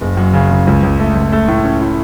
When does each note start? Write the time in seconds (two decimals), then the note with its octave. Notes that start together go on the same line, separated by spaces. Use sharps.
0.01 F#1
0.17 F#2
0.33 C#3
0.51 C#3
0.67 C#2
0.83 C#2
1.00 A3
1.15 C#2
1.32 A3
1.48 A2
1.64 C#4
1.81 E4